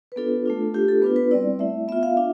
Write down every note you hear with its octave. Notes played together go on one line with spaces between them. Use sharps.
B4
B3 D4 F4 A4
A3 D4 F4
A3 D4 F4 G4
A4
B3 D4 F4 B4
B4
G3 C4 E4 D5
A3 E4 E5
B3 F4 E5
F5
D4 F4 E5